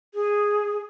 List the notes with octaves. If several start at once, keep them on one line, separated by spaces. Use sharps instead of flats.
G#4